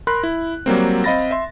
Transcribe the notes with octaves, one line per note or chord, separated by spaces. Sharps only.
A#4 B5 C6 F#6
E4
F#3 G3 A#3 C4
C4 D#5 F5 B5 A6 A#6
E5 C6